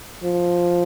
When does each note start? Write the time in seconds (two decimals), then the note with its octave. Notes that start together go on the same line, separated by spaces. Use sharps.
0.23 F3